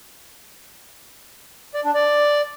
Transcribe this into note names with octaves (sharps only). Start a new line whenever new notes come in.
D5
D4
D5